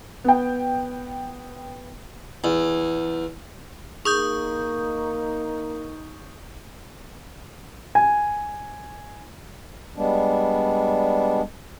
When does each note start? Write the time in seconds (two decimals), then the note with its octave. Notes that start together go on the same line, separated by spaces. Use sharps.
0.24 B3 G5
2.44 E2
4.05 A#3 D#4 G#4 C#6 D#6 G6
7.95 G#5
9.96 G3 G#3 B3 D4